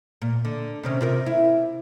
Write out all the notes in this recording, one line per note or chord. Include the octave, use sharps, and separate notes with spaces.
A#2
D3
C3 D#3 C#4
C3 F4 A#4
E4